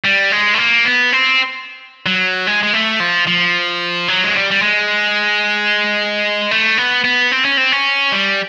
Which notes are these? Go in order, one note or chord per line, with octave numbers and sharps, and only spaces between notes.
G3
G#3
A3
A#3
B3
C4
F#3
G#3
G#3
A3
F3
F3
F#3
G#3
G3
G3
G#3
A3
B3
B3
C4
C#4
C4
C#4
G3